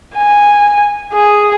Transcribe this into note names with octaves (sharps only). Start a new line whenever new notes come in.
G#5
G#4